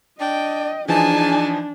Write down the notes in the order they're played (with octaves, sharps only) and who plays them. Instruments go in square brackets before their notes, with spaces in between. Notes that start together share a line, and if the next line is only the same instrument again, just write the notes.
[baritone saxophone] D4 [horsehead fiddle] D#5 [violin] G5
[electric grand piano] E3 F3 D#4 [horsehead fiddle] D4 [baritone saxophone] G#4 [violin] G#5 A5